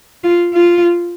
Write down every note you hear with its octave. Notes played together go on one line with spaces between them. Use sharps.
F4
F4